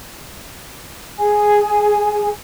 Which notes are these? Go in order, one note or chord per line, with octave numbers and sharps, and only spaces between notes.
G#4 G#5